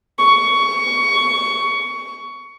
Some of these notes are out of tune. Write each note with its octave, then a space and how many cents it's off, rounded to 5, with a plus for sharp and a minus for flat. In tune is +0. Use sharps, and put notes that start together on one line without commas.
C#6 +20